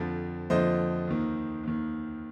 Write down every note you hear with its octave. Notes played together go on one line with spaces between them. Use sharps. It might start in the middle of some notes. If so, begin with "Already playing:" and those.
Already playing: F2 D3 F3
F2 D3 F3 C5 D#5
D#2 D#3
D#2 D#3